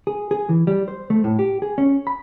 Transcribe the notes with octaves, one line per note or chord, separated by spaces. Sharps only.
G#4
G#4
E3
G3
C5
A3
A2
G4
G#4
C#4
B5